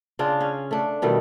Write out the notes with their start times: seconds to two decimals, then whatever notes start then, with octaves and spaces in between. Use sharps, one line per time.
0.19 C#3 D4 F4
0.40 C#4 F5
0.71 A3 D4
1.02 B2 D#3 G3 A3